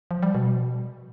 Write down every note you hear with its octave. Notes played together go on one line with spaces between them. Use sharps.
F3
G3
B2